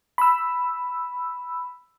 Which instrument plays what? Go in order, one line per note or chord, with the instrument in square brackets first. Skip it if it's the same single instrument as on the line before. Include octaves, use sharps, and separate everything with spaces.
[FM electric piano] B5 E6